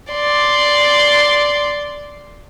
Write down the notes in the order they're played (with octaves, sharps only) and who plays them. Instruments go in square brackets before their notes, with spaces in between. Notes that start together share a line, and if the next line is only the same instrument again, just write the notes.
[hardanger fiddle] D5 C6